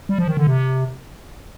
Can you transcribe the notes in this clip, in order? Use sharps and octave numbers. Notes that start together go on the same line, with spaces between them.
G3
F3
D#3
D3
C3